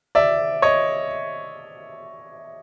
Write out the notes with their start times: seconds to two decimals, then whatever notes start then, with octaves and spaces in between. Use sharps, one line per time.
0.15 D5 E5
0.62 C#5 D#5